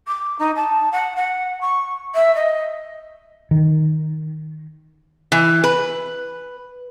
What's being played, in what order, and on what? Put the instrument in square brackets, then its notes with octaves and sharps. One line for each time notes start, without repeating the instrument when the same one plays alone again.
[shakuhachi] D6
D#4
A5
F#5
F#5
C#6
E5
D#5
[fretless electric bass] D#3
[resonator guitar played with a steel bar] E3
B4